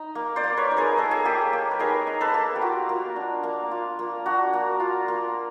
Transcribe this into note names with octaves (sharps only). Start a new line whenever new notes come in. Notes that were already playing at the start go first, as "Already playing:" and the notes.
Already playing: D#4
A#3
C5 D5
A#3
B4 C#5
D#4
G#4 A#4
D#4 A4
G#4
A#3 G4 A4
A#3
B4
D#4 G#4 A#4
D#4
A4 B4
A#3
G4
F4 F#4
A#3
D4
A#3
F4
A#3
D4 F#4
A#3
F4
A#3